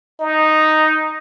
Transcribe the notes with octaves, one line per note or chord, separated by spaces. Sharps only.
D#4